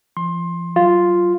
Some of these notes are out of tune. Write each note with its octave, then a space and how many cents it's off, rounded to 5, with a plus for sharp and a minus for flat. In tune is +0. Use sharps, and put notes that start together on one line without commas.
F3 -35 C6 +20
F#3 +25 F4 +0